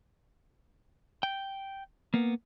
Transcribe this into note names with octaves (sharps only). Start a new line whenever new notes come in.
G5
A#3 B3